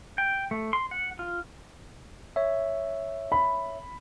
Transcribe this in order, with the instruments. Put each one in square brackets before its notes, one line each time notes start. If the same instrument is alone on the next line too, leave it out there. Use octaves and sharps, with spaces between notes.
[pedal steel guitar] G5
A3
C6
F#5
F4
[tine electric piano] C#5 E5
[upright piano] B5